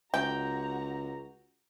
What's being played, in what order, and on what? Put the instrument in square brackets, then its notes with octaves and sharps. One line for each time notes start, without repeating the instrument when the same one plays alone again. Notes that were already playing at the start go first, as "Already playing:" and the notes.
[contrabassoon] C#2 [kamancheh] F#4 A#5 [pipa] G5